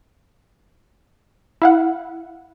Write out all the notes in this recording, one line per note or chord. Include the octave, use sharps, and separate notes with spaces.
E4 F5 F#5